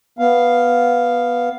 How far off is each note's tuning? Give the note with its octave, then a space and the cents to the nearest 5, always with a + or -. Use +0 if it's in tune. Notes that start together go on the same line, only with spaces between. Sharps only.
B3 -5 F5 +0